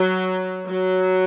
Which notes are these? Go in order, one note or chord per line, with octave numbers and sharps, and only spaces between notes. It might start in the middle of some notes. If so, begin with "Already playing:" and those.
Already playing: F#3
F#3